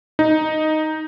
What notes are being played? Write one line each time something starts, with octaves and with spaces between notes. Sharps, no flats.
D#4